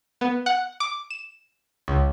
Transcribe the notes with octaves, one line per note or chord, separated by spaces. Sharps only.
B3
F#5
D6
E7
C#2